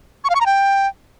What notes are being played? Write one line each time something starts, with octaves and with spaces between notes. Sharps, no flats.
C#6
F5
C#6
A#5
G5